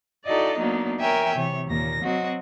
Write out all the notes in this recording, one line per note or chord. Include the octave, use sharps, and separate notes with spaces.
D#4 E4 F#4 A4 D5 D#5
F#3 A#3 B3 D4 D#4
A#4 C#5 E5 G5 G#5
C3 E3 C#5
D#2 A#2 A#6
F#3 C4 F#4 D#5